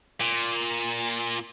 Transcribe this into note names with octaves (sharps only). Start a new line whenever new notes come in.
A#2